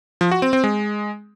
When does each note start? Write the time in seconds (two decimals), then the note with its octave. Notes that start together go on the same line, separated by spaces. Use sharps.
0.21 F3
0.31 F#4
0.42 C4
0.53 C4
0.64 G#3